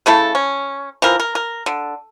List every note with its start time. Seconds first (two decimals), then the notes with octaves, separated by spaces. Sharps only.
0.06 C#3 A3 E4 A4
0.35 C#4
1.02 E3 F3 A#4
1.20 A#4
1.35 A#4
1.66 D3